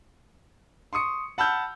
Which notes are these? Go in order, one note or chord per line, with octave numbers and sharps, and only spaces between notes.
C6 C#6 D#6 C#7
F#5 A5 B5 E6 F6 G6